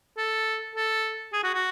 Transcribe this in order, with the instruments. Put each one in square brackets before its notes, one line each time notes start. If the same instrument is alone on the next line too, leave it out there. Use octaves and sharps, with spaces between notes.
[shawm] A4
A4
G#4
F#4
F#4